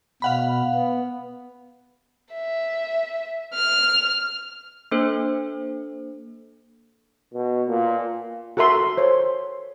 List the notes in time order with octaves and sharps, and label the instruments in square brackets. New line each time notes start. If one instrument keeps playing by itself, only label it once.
[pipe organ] B2 [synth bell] F5 F#5 B5
[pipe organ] B3
[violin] E5
F6
[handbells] A#3 D4 A4 C5
[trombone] B2
A#2
[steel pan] F#4 A4 A#4 E5 C6
C5 C#5